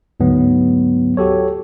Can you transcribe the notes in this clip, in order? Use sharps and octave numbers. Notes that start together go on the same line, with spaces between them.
D2 G#2 F#3 B3
F#4 G4 A4 C#5